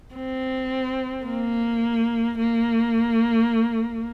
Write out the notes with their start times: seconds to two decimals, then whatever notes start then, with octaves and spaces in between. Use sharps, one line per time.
0.15 C4
1.27 A#3
2.39 A#3